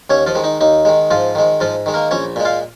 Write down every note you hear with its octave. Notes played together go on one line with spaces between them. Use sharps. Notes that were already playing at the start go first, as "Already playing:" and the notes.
D#2 C#4 C#5
F3 F4
D#3 G#3
D#4
D#2 D#4
D#3 G#3
G#2 F3 F4
D#3 G#3
G#2 F3 F4
D#3 G#3
A#3 A#4
A#1 C#4 C#5
A#2 G#3
F4 F5